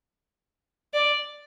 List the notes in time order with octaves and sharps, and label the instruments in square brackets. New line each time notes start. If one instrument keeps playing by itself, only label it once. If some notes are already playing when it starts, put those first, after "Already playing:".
[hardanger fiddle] D5